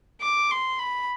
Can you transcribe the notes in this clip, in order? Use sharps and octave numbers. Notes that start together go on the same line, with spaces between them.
D6
C6
B5